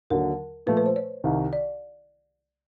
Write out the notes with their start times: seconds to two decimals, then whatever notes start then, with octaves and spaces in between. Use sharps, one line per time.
0.10 D#2 D3 F#3 A#4
0.67 A#2 F3 A3 B4
0.77 B4
0.86 C5
0.96 C#5
1.24 C2 C3 D#3
1.53 D5